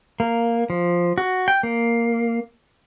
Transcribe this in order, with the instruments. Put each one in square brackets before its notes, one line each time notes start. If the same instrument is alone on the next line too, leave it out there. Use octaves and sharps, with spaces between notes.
[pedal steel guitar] A#3
F3
F#4
G5
A#3